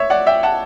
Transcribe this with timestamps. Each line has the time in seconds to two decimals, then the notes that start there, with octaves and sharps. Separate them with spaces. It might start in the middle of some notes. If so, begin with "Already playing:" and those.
Already playing: C#5 E5
0.10 D5 F#5
0.27 E5 G5
0.43 F#5 A5